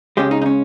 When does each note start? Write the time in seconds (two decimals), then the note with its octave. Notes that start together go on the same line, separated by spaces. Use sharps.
0.17 C#2 C#3 G#3 G4
0.31 D#4
0.42 D#4
0.46 C#4